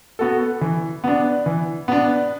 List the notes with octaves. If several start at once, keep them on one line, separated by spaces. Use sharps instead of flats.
B3 F#4 A4
E3
B3 D4
E3
B3 D4